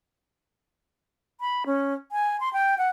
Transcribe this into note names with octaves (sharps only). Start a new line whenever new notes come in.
B5
C#4
G#5
C6
G5
F#5